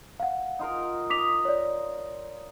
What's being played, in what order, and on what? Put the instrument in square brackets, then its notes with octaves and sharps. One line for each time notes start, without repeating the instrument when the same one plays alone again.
[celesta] F5 F#5
[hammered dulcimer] D#4 F4 A#4
[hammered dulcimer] D#4 D#5 [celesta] D6 B6 F7
[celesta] C#5 D5